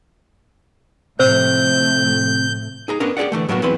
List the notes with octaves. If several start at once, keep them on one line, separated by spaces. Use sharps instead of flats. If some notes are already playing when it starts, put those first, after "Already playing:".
A2 C3 F3 A3 C4 C5 E6 G6
D#4 G#4 A#5
B3 C#4 D4 A#4
G4 G#4 B4 D5 F#5
D3 E3 A3
A2 F#3 A#3 B3 F#4
E2 F#3 C4 E4 B4 C6